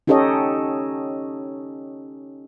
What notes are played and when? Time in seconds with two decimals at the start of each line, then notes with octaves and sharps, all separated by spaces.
0.07 C#4 D#4 G4 A4 C#5 D#5